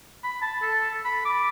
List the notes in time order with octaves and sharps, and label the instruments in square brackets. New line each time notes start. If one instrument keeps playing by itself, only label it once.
[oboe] B5
A5
A4
B5
D6